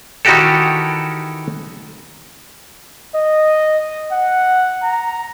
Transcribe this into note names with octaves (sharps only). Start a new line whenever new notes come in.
D#3 E3 D#4 F#4 G4 A4
D#5
F#5
A#5